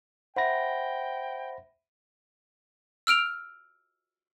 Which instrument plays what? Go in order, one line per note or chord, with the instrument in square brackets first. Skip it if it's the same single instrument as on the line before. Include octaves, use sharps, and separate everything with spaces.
[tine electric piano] C5 B5 A#6 [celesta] E5 F#5 [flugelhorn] G5
[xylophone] E6 F6 D7 F7